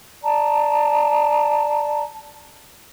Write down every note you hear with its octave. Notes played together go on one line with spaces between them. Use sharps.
D5 A5 A#5